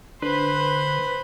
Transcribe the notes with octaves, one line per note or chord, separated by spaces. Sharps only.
D3 B4 C5 B5